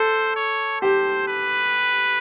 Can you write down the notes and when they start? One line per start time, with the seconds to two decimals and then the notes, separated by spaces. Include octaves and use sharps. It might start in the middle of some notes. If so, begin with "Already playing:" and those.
Already playing: A4 C5
0.36 C#5
0.81 G4 C5
1.27 B4